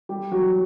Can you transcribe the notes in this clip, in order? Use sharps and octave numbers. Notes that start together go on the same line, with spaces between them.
G3 G4
F#3 F#4